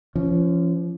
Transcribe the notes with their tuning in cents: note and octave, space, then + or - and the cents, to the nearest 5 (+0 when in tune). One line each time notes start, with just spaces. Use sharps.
F3 -35 C#4 +0